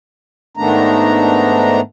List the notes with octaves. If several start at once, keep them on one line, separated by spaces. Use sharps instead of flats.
G#2 D#3 A3 B3 D4 A#5